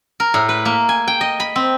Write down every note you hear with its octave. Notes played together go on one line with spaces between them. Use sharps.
A#4
A2
B4
A#3
G#5
G5
D#5
B5
C4